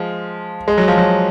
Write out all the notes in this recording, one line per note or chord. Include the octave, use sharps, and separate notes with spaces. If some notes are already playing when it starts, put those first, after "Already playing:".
Already playing: F3 G#3
G#3
F#3
F3
F#3